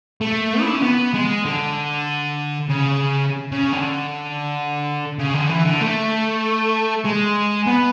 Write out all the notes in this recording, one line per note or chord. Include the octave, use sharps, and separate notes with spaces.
A3
E4
D4
C#4
B3
G#3
D3
C#3
C#3
D3
C#3
D3
E3
D3
A3
G#3
B3